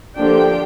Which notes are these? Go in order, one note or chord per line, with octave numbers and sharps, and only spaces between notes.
D3 F3 A#3 D4 G4 G5